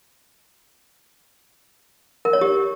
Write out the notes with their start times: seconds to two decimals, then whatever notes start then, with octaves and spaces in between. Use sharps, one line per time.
2.25 A#4
2.33 C#5
2.41 G4